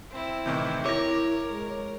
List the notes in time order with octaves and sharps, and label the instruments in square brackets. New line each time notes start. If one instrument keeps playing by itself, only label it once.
[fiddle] C4 E4
[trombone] A2 [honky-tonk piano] C3 D#3 E3
[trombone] E4 [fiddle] A#4 [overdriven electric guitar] C#5 [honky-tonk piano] D6 A#6
[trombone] G#3